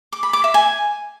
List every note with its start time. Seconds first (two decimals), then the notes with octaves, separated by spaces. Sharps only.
0.13 D6
0.23 B5
0.33 D6
0.44 E5
0.54 G#5